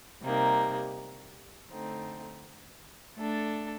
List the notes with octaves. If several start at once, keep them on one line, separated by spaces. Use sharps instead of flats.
C3 G3 A#3 D#4
D3 A3 C4 D#4
A3 D4 A4